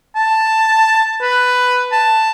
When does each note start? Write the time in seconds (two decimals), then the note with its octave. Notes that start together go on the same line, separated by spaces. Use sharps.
0.16 A5
1.22 B4
1.92 A5